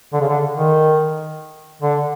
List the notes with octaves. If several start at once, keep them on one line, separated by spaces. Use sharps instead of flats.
D3
C#3
D3
D#3
D3